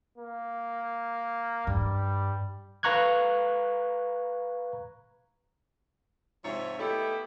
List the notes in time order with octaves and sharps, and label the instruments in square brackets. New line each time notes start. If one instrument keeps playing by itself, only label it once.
[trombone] A#3
[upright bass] G2 [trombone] G3
[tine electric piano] B4 F5 A#5 C#6 F#6 G#6
[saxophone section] G#2 C3 F3 C#5 E5
A3 B3 D#4 E4 G4 A4